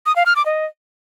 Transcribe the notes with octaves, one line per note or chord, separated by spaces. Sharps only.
D#6
F5
F6
D6
D#5